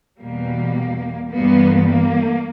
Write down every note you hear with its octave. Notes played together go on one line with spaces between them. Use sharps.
E2 B2 G3 A#3
G2 E3 G3 A#3 B3
A#3